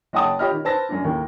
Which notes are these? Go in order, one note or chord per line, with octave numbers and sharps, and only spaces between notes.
F#1 D#5 F#5 G5 A5 D#6
F4 G4 C#5 D#5 B5 F6
D#3
B4 C5 A5 E6 A#6
F#2 C#4 D4
D#2 A2 A#4